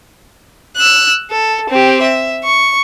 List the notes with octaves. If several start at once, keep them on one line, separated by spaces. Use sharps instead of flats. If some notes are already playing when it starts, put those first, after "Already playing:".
E6 F#6
A4
C4 G4
E5
C#6